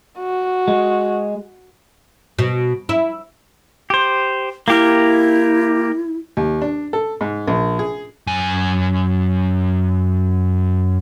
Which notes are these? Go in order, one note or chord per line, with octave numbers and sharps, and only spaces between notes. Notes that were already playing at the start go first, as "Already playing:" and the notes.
F#4
G#3
B2
E4
G4 C5
A#3 E4 G4 A#4
D#2
D4
A4
G#2
A#1
G#4
F#2 G#5